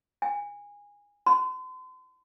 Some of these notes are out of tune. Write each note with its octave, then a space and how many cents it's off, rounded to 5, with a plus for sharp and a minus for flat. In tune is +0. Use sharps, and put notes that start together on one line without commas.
G#5 -20
C6 -40